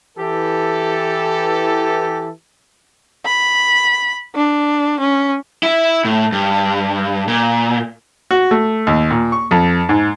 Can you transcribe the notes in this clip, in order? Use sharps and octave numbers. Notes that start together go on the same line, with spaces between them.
E3 G4 A4
B5
D4
C#4
E4
A2
G2
A#2
F#4
A3
D#2
A#2
C#6
F2
G#2